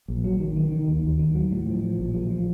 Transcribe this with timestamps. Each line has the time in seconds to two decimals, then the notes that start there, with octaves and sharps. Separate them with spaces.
0.08 A#1
0.24 F#3
0.40 D#3
0.56 D#3
0.72 D#3
0.88 D#2
1.04 D#2
1.19 D#3
1.35 F#3
1.51 A2
1.67 F3
1.83 F3
1.99 A#1
2.14 F3
2.30 F3